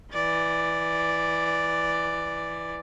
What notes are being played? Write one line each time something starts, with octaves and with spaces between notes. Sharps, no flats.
E3 D5